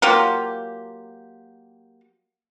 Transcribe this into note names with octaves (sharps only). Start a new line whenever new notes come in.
F#3 A#3 F4 G4